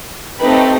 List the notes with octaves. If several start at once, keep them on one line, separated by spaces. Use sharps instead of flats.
A3 C4 D#4 G4 B4 B5